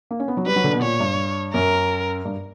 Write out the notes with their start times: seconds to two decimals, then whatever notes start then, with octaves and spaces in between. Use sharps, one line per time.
0.11 A#3
0.20 C#4
0.28 B3
0.37 F#3
0.46 G3 B4
0.56 F#3
0.64 D3
0.73 B2
0.82 A#2 C#5
1.00 G2
1.54 F#2 A#4
2.25 G2